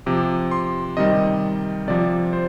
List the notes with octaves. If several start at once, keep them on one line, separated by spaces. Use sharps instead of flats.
C3 F3 D6
C6
C3 D#3 G3 D#5
C3 F3 D5
C5